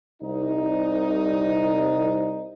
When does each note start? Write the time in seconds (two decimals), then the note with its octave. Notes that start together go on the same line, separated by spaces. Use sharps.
0.22 C2 D#4